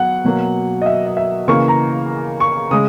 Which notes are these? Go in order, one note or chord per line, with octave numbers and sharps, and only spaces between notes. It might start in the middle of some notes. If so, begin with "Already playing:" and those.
Already playing: F#3 B3 F#5
B2 F#3 A#3
D#5
E5
D#5
E5
C#3 E3 A#3 C#6
A#5
C#6
C#3 G#3 D#6